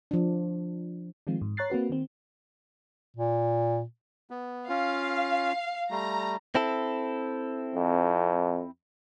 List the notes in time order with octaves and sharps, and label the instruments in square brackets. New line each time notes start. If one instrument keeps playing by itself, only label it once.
[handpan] F3 D4
[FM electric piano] D#3 F3 G#3 C4 F4
G#2
C#5 A#5 F#6 A6 C7
A#3 C4 F#4 B4
D#3 C4
[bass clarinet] A#2
[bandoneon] B3
[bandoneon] C#4 F4 [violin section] F5
[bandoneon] G3 A3 [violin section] A#5
[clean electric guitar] C4 E4 A4
[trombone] F2